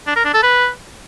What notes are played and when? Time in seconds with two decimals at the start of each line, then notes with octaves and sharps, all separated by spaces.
0.07 D4
0.16 A#4
0.25 D4
0.34 A4
0.43 B4